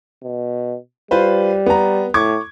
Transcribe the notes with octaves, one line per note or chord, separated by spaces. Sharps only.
B2
G3 F4 B4 C5
B3 A#5
A2 C#6 D6 G#6